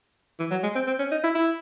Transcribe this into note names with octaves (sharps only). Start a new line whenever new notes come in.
E3
F#3
G#3
C4
C4
C#4
D#4
E4
E4